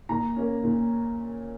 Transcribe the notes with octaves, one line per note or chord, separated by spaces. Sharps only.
A#2 A#5
A#3 C#4
A#2